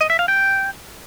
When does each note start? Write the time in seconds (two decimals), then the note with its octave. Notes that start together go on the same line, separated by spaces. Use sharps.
0.01 D#5
0.10 E5
0.19 F5
0.28 G5